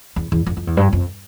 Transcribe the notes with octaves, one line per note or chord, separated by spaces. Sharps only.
E2
E2
F2
F2
E2
G2
F2